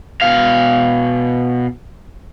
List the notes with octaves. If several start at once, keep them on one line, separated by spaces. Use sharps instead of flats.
B2 F5